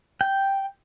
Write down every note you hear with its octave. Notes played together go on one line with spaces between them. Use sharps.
G5